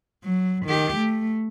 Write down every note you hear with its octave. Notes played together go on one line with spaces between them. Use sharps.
F#3
D#3 G4
A3